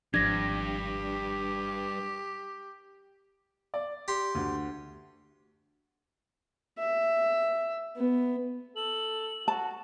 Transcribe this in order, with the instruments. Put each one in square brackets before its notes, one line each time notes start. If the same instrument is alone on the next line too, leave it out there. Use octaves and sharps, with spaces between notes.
[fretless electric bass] G#1 F3 D4 [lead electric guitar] G2 [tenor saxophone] G4 [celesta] G#6 A#6
[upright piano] D5
[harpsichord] G4 C6
[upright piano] D2
[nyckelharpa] E5
B3
[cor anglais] A4 [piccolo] F#7
[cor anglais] F#4 [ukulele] A5